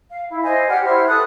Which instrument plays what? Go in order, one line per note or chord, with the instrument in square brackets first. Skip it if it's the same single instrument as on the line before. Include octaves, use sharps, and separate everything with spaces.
[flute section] F5
E4
C5 D#5 G#5
G4 D5 F#5 F6
E4 C5 F6
A4 B4 D#6 F#6